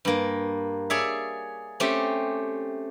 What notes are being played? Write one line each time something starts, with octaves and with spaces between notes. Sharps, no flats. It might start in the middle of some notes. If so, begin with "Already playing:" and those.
G2 A#3
G#4 C#5 D5 E5
A3 C4 C#4 G4